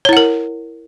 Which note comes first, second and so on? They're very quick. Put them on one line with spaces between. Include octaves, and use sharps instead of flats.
C#5 E4 F#5 A#4